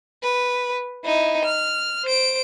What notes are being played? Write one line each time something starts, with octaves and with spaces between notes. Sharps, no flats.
B4
D#4 E4
F6
C5 D7